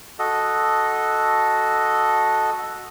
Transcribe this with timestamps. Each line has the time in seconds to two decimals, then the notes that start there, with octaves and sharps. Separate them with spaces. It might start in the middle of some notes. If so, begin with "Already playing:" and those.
0.19 F#4 A4 D#5